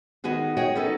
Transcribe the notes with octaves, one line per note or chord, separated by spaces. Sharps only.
D#3 B3 D#4 F#4 G#4
F#4 G#4 C#5 D#5 G5
B3 C#4 D#4 A4